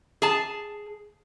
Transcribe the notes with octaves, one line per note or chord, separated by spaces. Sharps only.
G#4 A5